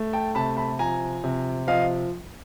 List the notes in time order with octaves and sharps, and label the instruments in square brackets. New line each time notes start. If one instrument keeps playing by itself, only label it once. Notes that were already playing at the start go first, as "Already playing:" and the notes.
Already playing: [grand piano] A3
G5 A5
C3 A5 B5
A5 B5
F3 G#5 A#5
C3
F3 D#5 F5